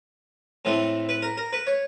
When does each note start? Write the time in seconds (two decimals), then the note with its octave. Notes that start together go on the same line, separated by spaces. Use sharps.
0.65 A2 E3 A3 C4
1.09 B4
1.22 A#4
1.37 A#4
1.53 B4
1.67 C#5